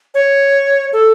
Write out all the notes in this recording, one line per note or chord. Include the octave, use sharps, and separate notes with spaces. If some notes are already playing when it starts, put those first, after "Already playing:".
C#5
A4